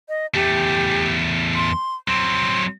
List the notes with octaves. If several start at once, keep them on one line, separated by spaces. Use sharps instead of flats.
D#5
E2 A3 G4
C6
F#3 C4 C6